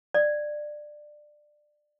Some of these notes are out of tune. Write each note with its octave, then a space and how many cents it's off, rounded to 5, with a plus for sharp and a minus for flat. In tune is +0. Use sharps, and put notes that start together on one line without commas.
D5 +20